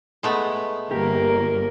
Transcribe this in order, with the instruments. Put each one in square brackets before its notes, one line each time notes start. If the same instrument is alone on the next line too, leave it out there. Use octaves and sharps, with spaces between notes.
[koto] G#3 A3 B3
[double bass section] G1 [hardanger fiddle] A#3 A#4 [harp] G4